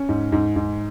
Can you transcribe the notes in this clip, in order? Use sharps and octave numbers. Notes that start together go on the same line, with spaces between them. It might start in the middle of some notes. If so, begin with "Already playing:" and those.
Already playing: C#4
G#2
G#2
G#2